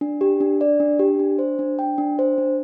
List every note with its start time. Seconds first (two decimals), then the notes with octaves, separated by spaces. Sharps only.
0.01 D4
0.21 G4
0.40 D4
0.61 D5
0.80 D4
0.99 G4
1.19 D4
1.39 C5
1.59 D4
1.79 G5
1.98 D4
2.19 C5
2.38 D4